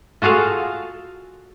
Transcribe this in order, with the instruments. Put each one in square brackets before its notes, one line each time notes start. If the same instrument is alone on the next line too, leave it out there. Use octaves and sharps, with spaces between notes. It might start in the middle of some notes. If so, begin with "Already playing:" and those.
[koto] F4 F#4 G#4 A4 F5